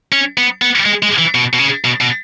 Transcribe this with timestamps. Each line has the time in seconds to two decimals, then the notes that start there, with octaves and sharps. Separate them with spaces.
0.12 C#4
0.37 B3
0.62 B3
0.86 G#3
1.02 G#3
1.18 E3
1.35 B2
1.53 B2
1.59 C#3
1.84 B2
2.01 B2